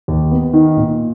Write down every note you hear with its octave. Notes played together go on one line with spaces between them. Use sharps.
D#2
B3
D#3
A#2